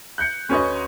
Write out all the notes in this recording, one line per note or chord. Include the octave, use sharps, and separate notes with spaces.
F#6 G6 C#7
D2 C#4 F#4 B4 D#5